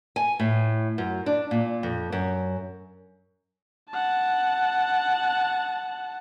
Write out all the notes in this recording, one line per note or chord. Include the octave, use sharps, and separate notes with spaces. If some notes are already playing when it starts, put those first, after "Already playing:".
G#5
A2
F#2
D4
A#2
F2
F#2
F#5 A5